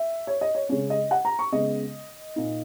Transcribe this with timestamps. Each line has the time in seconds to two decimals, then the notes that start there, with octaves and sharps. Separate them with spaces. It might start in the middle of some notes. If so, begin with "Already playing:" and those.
Already playing: E5
0.27 C#5
0.41 D#5
0.55 C#5
0.69 C#3 G#3 C#4 C#5
0.90 D#5
1.11 F#5
1.25 A#5
1.39 C#6
1.52 C#3 G#3 B3 D#5
2.36 A#2 A#3 D#4